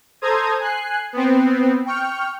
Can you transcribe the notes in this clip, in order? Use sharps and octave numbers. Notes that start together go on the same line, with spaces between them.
A4 C5 A#5 D#6 G#6
G#5 F#6 C7
B3 C4
G5 C#6 F6